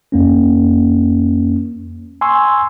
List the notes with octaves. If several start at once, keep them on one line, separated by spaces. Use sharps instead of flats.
F2 A#3 C#4
G#5 C6 C#6 E6